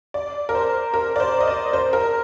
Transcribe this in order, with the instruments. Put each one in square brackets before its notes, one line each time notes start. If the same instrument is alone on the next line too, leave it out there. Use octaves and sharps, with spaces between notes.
[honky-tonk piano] D5
A#4
C5
A#4
D5
C5
D#5
D5
C5
A#4